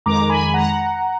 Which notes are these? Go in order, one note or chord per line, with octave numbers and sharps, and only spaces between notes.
F2 D#3 G#3 A#5 D6
G#5 B5
F#5 A#5